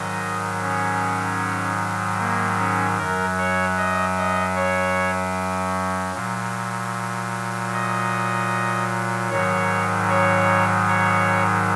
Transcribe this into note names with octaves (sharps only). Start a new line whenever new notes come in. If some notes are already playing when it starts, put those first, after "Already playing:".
Already playing: G#2 D#3 F#3 D#5
C#4
A#3
C#4
F#2 F#3 A#4
C#5
D#5
D#5
C#5
A#2 F#3
D#5
G#2 D#3 F#3 C#5
C#5
C#5